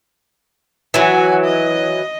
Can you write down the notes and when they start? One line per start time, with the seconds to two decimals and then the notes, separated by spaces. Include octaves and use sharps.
0.94 E3 F#3 F#4 G#5
1.44 D#5